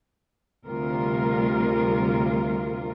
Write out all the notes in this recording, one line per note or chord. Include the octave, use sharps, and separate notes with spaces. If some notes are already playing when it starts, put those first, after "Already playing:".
D2 C3 G3 F4 A#4